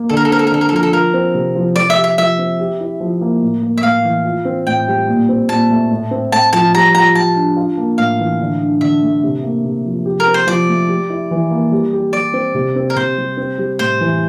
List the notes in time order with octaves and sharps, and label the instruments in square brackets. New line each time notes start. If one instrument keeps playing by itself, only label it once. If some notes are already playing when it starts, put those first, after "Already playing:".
Already playing: [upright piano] A#3
[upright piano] D3 [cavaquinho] A4
[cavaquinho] A#4
A4
[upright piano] C4 [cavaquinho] A#4
[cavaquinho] A4
A#4
[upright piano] D3 [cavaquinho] A4
[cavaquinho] A#4
A4
[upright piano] F3 [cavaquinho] A#4
[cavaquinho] A4
[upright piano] F4 [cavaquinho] A#4
[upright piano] C4
C3
F3
[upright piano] F3 [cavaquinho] D5
[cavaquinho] E5
[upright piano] G4
[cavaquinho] E5
[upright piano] F3 [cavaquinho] E5
[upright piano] C4
G4
E4
F3
A#3
A2
A#3
[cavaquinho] E5
[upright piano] A2 [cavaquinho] F5
[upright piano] E3
F4
C4
[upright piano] A2 [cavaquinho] G5
[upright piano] G3
A#2
C4
[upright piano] A#2 [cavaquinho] A5
[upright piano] A3
A2
C4
[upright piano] A2 [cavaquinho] A5
[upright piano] F3 [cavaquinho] A5
[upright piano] G3 [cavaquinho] A#5
[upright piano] F4 [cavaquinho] A#5
[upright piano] G3 [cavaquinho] A5
[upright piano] D4
F4
A#3
[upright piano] A2 [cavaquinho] F5
[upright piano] E3
D3
D4
[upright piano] D3 [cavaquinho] E5
[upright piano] A3
C3
A#3
C3
F3
G4
[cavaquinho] A#4
[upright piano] C4
[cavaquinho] C5
[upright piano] F3 [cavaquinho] D5
[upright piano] A3
G4
E4
E3
A#3
G3
G4
[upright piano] G3 [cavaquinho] D5
[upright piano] C4
C3
C4
[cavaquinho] A#4
[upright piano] C3 [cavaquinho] C5
[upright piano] G3
C4
G3
[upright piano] A2 [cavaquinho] C5
[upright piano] E3